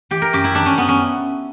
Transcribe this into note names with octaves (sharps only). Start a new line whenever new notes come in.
E3 G4
A#4
F#2 G4
E4
E3 D4
C#4
F#2 B3
C#4